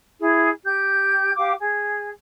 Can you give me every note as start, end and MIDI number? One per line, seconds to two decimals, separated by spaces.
0.21 0.48 64
0.21 0.48 68
0.65 1.32 67
0.65 1.32 91
1.36 1.51 67
1.36 1.51 77
1.36 1.51 86
1.59 2.08 68